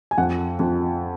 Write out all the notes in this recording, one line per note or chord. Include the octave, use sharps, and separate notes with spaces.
G#5
F2 F#5
F2